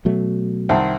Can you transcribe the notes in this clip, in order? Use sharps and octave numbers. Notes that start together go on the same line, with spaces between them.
B2 F#3 A3
C2 D#3 C4 E5 F#5 A5